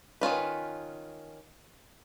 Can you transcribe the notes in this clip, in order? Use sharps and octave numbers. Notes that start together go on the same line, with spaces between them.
D#3 C#4 F4 B4